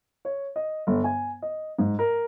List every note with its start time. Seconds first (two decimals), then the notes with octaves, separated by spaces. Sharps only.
0.25 C#5
0.56 D#5
0.87 G1
1.04 G#5
1.42 D#5
1.79 G#2
1.99 A#4